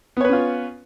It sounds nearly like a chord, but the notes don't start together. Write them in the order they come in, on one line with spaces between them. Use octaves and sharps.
B3 C#5 B4 C#4 F4